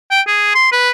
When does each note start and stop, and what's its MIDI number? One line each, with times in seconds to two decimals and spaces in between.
0.11 0.21 79
0.27 0.51 68
0.55 0.68 84
0.72 0.91 71